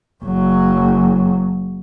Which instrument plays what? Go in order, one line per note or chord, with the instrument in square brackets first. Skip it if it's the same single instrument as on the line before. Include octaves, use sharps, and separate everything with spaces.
[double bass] F#1 F#3